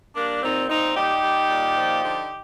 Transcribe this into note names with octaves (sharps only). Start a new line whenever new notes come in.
G3 A#3 D4
A#2 C4 D#4
A#2 C4 D#4
G3 D#4 G4
G3
A#2
F3
D3